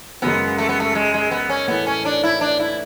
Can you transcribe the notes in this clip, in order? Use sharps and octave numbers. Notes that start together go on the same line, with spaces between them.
F#2 C#3 G#3 B3
A3
B3
A3
G#3
G#3
B3
C#4
A2 E3 A3 B3 E4 B4
C#4
D4
E4
D4
E4